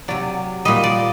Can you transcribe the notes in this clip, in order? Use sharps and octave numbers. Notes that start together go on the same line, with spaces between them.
C3 F#3 D5
A#2 G3 D#5
D5